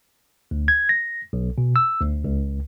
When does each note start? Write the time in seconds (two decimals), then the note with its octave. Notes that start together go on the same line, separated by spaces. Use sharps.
0.51 D2
0.68 G#6
0.89 A#6
1.33 B1
1.58 B2
1.76 E6
2.01 D2
2.24 C#2